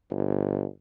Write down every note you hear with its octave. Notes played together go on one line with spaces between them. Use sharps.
G1